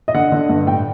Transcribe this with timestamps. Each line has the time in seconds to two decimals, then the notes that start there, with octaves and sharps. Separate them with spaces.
0.08 D#5
0.14 D3 F#5
0.32 D3
0.49 G2
0.67 A2 G5